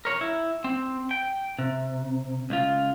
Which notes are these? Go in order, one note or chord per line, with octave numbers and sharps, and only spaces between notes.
A#4 C#5
E4
C4
G5
C3
C#2 F4